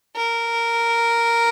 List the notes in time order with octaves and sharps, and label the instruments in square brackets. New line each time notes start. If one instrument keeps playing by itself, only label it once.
[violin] A#4